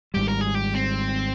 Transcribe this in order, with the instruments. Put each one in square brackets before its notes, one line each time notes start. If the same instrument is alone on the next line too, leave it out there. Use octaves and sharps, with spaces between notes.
[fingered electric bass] G#1 G#2 G3 [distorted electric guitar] G4
[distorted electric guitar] A#4
G#4
G4
C4